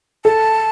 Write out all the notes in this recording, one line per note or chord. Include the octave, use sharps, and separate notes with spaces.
A4 A5